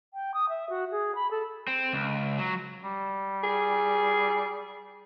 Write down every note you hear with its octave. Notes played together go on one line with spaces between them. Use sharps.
G5
D#6
E5
F#4
G#4
B5
A4
C4
C#2
F#3
G3
G#4